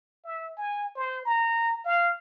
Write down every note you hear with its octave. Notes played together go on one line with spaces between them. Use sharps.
E5
G#5
C5
A#5
F5